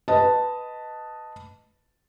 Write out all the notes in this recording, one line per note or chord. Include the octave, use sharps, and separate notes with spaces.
B4 D#5 A5